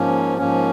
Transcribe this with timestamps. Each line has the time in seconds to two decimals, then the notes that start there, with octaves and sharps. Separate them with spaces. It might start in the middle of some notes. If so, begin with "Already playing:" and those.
Already playing: G#2 F3 A#3 C#4
0.38 G#2 F3 A#3 C#4